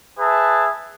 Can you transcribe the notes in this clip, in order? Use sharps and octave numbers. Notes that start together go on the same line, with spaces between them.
G#4 B4 E5 A5